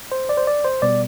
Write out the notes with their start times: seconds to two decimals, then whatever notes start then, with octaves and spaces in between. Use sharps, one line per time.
0.12 C5
0.29 D5
0.37 C5
0.47 D5
0.65 C5
0.82 B2 G3 B3 D5